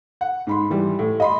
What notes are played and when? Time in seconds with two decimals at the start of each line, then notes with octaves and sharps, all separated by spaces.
0.21 F#5
0.47 G#2 B5 C6
0.70 E3 G3
0.99 A2
1.20 D#5 B5 C6